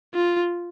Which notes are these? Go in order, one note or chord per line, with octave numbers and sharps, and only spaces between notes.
F4